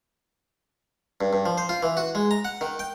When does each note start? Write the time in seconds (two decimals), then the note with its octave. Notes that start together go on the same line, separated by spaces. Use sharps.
1.21 G2
1.33 G2
1.46 F3
1.58 C5
1.69 F4
1.83 E3
1.97 F#4
2.15 G#3
2.31 A#5
2.45 F#5
2.61 D#3
2.79 G5